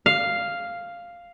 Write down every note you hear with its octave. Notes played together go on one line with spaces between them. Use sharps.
F5